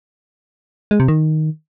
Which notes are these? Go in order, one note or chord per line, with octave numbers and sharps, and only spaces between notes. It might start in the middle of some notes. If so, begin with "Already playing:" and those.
G#3
C3
D#3